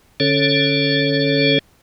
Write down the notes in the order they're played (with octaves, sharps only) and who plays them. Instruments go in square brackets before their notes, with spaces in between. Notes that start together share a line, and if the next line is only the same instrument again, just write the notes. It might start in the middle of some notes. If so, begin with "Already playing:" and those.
[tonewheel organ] D3 C#4 A4 C#5